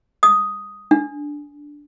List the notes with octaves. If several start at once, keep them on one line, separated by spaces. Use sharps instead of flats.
D#6
D4